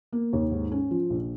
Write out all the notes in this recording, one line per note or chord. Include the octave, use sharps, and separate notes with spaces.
A#3
D#2
G#2
C#4
F3
A#1